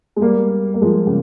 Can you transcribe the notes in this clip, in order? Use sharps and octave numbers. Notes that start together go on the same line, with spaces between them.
G#3
G3 A#3
A#3
F3 G#3
C#3